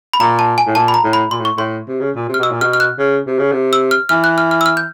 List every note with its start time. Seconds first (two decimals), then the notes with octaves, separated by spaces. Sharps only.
0.13 B5
0.20 A#2 A#5
0.39 A5
0.58 G#5
0.66 A2
0.75 A#2 A5
0.88 B5
0.94 A#5
1.04 A2
1.13 B5
1.31 A#2 C6
1.40 A2
1.45 C#6
1.57 A2 C6
1.88 C3
2.00 C#3
2.16 A#2
2.29 C3
2.34 F6
2.40 B2 E6
2.51 A#2
2.61 B2 F6
2.73 F6
2.80 F#6
2.98 C#3
3.27 C3
3.39 C#3
3.52 C3
3.73 E6
3.91 F6
4.09 E3 F6
4.24 F#6
4.38 F6
4.51 F6
4.61 E6
4.66 F6
4.77 G6